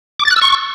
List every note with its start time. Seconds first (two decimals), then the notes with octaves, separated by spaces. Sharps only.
0.20 D6
0.25 A6
0.31 F#6
0.36 E6
0.42 C#6